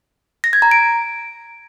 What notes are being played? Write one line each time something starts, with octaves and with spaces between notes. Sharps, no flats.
A#6
G#6
A#5
D7